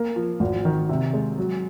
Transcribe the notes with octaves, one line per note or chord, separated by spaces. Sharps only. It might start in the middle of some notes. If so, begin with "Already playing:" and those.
Already playing: A#3
F3
G#1
D#3
C3
G#3
F#3